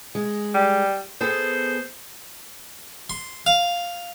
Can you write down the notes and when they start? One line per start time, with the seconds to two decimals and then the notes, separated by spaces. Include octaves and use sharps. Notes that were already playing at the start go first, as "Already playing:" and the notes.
0.15 G#3
0.55 G3
1.21 B3 G#4 A4 C5
3.10 C6
3.46 F5